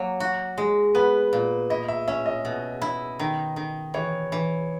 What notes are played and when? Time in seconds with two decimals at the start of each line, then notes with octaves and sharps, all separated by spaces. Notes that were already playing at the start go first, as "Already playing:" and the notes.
Already playing: F#3 A#3
0.20 F#4
0.58 G#3
0.95 B3 B4
1.33 A#2
1.70 E4 D#5
1.88 E5
2.08 C#4 E5
2.26 D#5
2.45 B2
2.82 E4
3.19 D#3
3.56 D#3
3.94 E3 C#5
4.32 E3